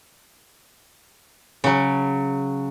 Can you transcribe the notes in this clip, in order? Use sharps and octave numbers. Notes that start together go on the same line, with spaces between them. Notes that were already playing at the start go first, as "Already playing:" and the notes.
C#3 F#3